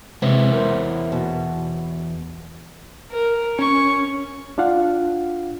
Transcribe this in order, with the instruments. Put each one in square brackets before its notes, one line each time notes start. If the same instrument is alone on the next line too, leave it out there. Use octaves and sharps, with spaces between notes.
[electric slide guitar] E2 C#5 E5 [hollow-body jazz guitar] C3 G#3 [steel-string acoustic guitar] E3
[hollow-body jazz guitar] A#4 C5
[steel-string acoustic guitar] B2
[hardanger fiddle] A#4
[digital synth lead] C#4 [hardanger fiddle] C#6
[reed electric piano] D4 F4 F5 F#5